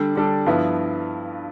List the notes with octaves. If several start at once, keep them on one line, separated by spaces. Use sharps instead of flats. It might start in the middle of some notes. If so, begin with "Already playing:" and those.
Already playing: D3 G3 D4 A4
D3 G3 D4 A4
G2 F3 B3 E4